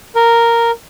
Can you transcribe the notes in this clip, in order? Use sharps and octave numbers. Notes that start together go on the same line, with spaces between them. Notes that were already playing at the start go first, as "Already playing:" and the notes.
A#4